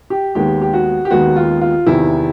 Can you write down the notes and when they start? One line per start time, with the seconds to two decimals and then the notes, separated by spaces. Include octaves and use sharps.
0.10 G4
0.35 D#2 D#3 G#3 B3 G4
0.62 G4
0.73 F#4
1.05 G4
1.11 D#2 D#3 G#3 B3 F#4
1.36 F4
1.61 F4
1.86 E2 C3 D#3 E4